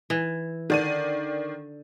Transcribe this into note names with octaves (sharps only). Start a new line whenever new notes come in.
E3
D3 D#3 D5 D#7